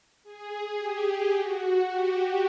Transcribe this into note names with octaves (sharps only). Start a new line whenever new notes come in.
G#4
G4
F#4
G4